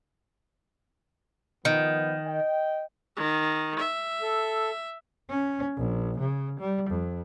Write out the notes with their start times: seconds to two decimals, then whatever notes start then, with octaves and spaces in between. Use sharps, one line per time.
1.65 D#3 F3 B3
2.26 D#5 G5
3.16 D#3
3.79 E5
4.22 A4
5.30 C#4
5.77 A#1
6.19 C#3
6.60 G3
6.90 F2